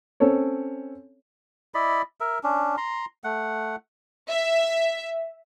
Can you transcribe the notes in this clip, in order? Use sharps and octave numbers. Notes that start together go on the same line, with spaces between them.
C4 C#4 A4 C#5
E4 D5 D#5 B5
A#4 E5
C#4 D4
A#5 C6
A3 F#5
E5